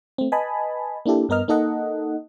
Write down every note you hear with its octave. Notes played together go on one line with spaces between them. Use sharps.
A3 C4
B4 D#5 G#5 A5 B5
A#3 D4 E4 G4 A4
G2 B3 A#4 D#5 F6
A#3 D#4 A4 D#5 F#5